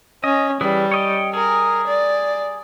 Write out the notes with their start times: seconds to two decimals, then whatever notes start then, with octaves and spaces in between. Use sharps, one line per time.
0.24 C#4 D#5
0.61 E3 G3 G#4 B4
0.91 C#5 D#5 G5
1.33 G#4 A#4
1.87 D5